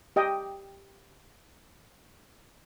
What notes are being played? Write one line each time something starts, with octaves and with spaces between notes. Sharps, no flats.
G4 D#5 G5